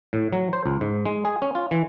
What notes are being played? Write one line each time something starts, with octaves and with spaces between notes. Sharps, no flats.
A2
F#3
C5
C#2
G#2
G#3
G#4
C#4
F4
E3